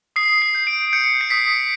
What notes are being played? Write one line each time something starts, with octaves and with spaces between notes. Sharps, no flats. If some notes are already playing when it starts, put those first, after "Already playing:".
D#6 C7
C7
G6
D7
G6 C#7
C7
D#6 B6